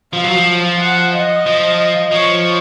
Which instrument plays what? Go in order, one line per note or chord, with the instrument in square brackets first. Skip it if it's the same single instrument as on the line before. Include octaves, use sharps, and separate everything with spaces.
[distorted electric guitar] F3 [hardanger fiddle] F5
[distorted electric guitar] F#3
F3
[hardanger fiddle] F#5
D#5
[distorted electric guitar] F3
[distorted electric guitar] F3 [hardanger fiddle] C#5